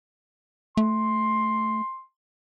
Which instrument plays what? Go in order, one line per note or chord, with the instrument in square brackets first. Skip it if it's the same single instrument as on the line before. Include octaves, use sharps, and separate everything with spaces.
[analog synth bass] A3 [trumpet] C6